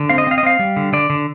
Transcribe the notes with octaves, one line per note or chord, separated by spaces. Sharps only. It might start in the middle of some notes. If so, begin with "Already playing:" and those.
Already playing: D3
C4 F5
D#5
C4 F5
D#5
C4 F5
G3
D3
D3 D5
D3